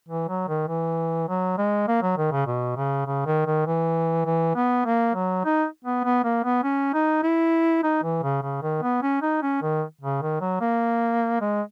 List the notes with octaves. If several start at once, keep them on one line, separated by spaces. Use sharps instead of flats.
E3
F#3
D#3
E3
F#3
G#3
A#3
F#3
D#3
C#3
B2
C#3
C#3
D#3
D#3
E3
E3
B3
A#3
F#3
D#4
B3
B3
A#3
B3
C#4
D#4
E4
D#4
E3
C#3
C#3
D#3
B3
C#4
D#4
C#4
D#3
C#3
D#3
F#3
A#3
G#3